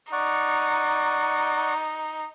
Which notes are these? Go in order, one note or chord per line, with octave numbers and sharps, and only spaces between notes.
D#4 D5 F#5 C#6